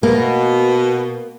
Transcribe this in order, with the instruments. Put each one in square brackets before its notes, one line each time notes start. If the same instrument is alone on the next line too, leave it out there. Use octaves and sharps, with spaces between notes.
[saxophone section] B2 [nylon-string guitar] A#3